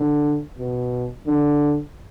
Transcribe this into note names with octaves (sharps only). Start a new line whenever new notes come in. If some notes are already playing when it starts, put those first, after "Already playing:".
Already playing: D3
B2
D3